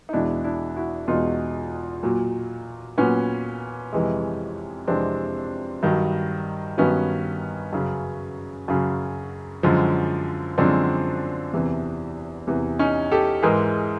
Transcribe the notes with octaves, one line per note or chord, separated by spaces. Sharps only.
D#4
E2 B2 G#3 D4 E4
D4 E4
E4 F#4
E2 B2 G#3 D#4 F4
A#2 F#3
A#2 F#3 B3 C#4
F2 C3 E3 G#3
F2 C3 E3 G#3 C4 D4
G2 D#3 F#3
G2 D#3 F#3 B3 C#4
F#2 C#3 F#3
F#2 C#3 F#3
F#2 D3 F3 G#3
F#2 D3 F3 G#3 C4 D4
E2 C3 E3
E2 C3 E3
C#4 D#4
G4 A4
G#2 E3 G#3 G#4 A#4